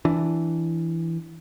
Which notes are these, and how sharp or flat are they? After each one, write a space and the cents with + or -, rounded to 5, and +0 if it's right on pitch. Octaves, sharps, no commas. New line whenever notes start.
E3 +0 D4 +0